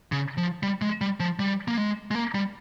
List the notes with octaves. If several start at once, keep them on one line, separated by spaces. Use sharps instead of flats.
C#3
F3
G3
G#3
G3
F3
G3
A#3
G#3
G#3
A#3
G3